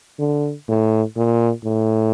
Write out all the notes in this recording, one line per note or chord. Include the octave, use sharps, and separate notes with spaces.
D3
A2
A#2
A2